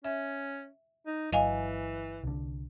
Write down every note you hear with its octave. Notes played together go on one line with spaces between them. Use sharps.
C#4 E5
D#4
G1 E3 F#3 D#5 F5 G#5
C2 D3